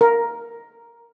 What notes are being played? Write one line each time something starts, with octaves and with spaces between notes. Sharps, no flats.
A#4